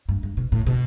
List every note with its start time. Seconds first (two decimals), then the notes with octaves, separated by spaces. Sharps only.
0.09 G2
0.23 G2
0.37 B2
0.52 A2
0.67 B2